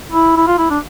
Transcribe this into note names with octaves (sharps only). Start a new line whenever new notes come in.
E4
E4
F4
E4
D4